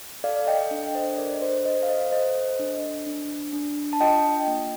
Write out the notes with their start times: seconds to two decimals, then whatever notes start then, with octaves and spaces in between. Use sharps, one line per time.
0.24 A4 D5 F5
0.47 D#5 G5
0.71 D4
0.95 C5 D#5
1.18 A4 A#4 D5
1.42 C5
1.65 A4 C5 D#5
1.83 F5
1.89 C5 D#5
2.12 A4 C5 D#5
2.59 D4
3.06 D4
3.53 D4
3.93 A5
4.01 F4 D#5 G5
4.47 A#3